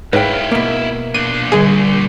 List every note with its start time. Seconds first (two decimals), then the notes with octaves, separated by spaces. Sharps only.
0.13 G#2 E4 B4 C#5 F5 G5
0.52 B2 A#3
1.14 A#2 D4 D#7
1.52 D3 G3 G#4